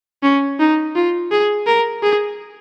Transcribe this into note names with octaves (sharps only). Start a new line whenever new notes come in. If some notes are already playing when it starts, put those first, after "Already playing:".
C#4
D#4
F4
G#4
A#4
G#4